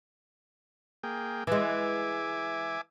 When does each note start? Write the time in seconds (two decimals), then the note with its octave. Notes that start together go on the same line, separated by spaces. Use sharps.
1.03 A#3 G#4 G5
1.47 E3 G#3 E5 G#5 D6